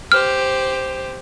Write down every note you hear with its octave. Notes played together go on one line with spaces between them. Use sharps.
G4 C5 F6